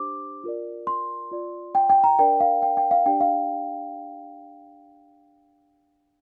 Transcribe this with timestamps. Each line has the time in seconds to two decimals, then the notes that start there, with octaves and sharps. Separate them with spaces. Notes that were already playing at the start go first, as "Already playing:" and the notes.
Already playing: D4 G4 C5 D6
0.44 F4 A#4 D5
0.87 C6
1.31 F4 D5
1.75 G5
1.90 G5
2.04 A#5
2.19 D4 A#4 D5 G5
2.40 F5
2.62 G5
2.77 G5
2.91 F5
3.06 D4 G4 D5 G5
3.20 F5